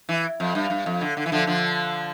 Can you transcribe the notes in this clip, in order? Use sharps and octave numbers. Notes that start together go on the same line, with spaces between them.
E3
F2
G2
G2
F2
D3
D3
E3
D3 F3
D3 F3